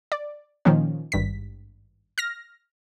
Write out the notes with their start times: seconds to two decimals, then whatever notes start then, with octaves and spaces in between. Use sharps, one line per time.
0.12 D5
0.65 A#2 D#3 F3 A#3 C#4
1.12 G#1 G2 B6
2.18 F6 A#6